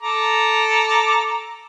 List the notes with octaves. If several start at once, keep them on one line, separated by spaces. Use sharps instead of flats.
A4 A#5 D6